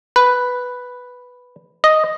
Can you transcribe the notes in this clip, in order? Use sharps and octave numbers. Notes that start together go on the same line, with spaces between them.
B4
D#5